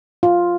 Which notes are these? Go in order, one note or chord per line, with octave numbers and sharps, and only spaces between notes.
F4